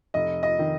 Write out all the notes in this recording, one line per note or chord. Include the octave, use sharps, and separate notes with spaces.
F1 D#5
D#5
D#3